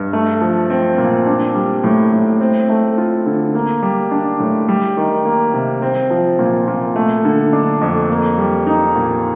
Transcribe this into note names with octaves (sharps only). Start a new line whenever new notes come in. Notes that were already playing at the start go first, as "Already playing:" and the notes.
Already playing: G2
A3
F3
C4
A#2
D4
G3
A2
A2
C4
A3
F4
D3
A#3
G3
D4
A2
G3
D#3
A#3
C3
C4
F3
A#2
A#2
A3
D3
D4
F2
A#3
G3
D#4
A#2